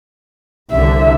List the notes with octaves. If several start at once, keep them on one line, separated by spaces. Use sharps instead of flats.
C2 D3 E5